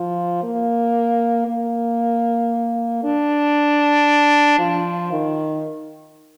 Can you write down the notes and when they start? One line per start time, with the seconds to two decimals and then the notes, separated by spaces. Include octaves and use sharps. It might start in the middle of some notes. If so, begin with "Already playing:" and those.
Already playing: F3
0.43 A#3
1.47 A#3
3.03 D4
4.59 F3
5.12 D#3